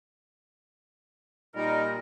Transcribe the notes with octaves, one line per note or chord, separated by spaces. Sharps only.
A#2 G3 D#4 A#4